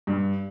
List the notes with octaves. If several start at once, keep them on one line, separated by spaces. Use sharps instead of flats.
G2